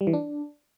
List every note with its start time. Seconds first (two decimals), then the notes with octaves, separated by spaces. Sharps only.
0.01 G3
0.07 E3
0.13 D4